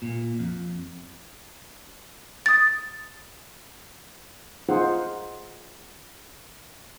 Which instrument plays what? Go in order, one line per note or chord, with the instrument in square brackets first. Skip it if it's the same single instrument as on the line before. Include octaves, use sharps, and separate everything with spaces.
[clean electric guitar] A#2
F2
[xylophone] D#6 A6
[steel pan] D#4 F4 G#4 C5 F#5